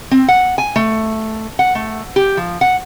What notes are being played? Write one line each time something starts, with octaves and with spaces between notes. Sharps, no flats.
C4
F#5
G#5
A3
F#5
A3
G4
F3
F#5